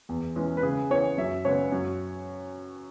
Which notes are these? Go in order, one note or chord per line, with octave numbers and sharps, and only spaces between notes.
E2
E3 G#3 C#4
B4
C#3 G#4
E3 B3 C#5
F#2 E5
C#3 G#3 B3 C#5
F#2